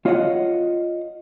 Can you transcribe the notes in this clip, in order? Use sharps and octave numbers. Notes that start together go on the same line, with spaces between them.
F4 C#5 D#5 E5 F#5